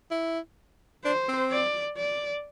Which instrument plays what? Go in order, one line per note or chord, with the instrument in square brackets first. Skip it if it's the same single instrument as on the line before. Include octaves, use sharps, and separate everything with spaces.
[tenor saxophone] E4
[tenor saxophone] D4 [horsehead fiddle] C5
[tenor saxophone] C4
[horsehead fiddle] D5
D5